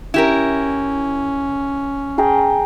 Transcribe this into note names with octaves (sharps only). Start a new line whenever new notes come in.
C#4 E4 G4 A#4
G#4 G5 A#5